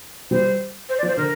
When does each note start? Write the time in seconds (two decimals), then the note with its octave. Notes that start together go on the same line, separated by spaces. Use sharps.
0.31 G3 C5
0.89 C5
0.98 D5
1.03 F3
1.08 C5
1.17 D3 A#4